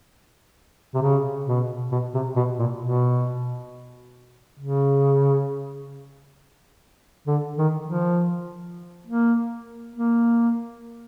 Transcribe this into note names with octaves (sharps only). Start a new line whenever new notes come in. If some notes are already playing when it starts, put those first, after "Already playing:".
C3
C#3
B2
B2
C3
B2
A#2
B2
C#3
D3
D#3
F3
A#3
A#3